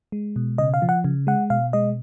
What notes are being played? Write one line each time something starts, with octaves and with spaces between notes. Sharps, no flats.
G#3
B2
C#3 D#5
F5
F3
F#5
C#3
G#3 F#5
B2 F5
G#3 D#5